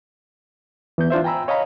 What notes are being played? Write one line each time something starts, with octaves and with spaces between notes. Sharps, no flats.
E3 B3 G6
D4 F4 C5 E5
G5 G#5 A#5 B5 E6
C#5 D#5 F5 A#5 B5